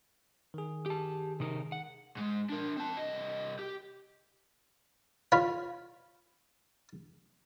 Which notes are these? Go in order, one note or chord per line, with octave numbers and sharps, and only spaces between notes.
D#3 G#4
G4 A5
C3 D#4 A#4
F#5
G#2 G#3
D4 A#4
C4 A5
C2 D#5
G4
F4 C#5 B5